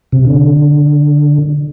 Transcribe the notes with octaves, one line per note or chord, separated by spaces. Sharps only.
C3
D3